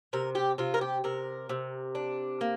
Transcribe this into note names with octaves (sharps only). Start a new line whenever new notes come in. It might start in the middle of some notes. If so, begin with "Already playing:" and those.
C3 A#4
G4
C3 F4
A#4
G4
C3 A#4
C3
D4
A#3